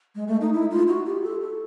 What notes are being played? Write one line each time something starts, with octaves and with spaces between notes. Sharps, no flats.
G#3
A3
D#4
E4
F4
F#4
G4
A4
A4